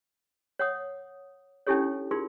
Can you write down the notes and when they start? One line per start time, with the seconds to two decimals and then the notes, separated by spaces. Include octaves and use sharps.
0.59 C#5 F#5 D#6
1.67 C#4 D4 E4 G4 A4 C#5
2.11 D#4 F4 G#4 A#4 C6